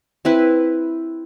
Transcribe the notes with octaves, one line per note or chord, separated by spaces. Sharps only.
C4 E4 B4